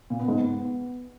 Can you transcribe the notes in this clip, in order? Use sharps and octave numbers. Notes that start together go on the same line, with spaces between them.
A#2
B3
G#2
B3